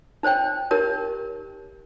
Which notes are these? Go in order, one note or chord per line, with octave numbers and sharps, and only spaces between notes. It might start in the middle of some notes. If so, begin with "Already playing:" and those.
D#4 C5 C#5 G5
D#4 G4 A#4 C#5